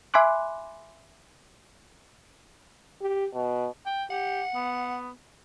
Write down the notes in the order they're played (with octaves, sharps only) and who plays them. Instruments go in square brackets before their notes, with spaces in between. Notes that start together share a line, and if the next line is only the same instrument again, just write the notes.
[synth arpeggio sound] E5 G#5 B5 C6 D6 F#6
[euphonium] G4
B2
[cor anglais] G5
[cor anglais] G4 [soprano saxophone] F#5
[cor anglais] B3